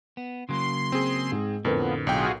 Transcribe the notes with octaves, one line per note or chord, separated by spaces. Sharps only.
B3
C#3 F#3 A#3 C6
C4 G#4
G#2
F2 A2 D3 F3 B3 A#4 B4
B1 F4 F#4 G#4 G5